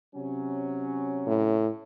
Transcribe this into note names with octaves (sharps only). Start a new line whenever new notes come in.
C3 F#3 C#4
A2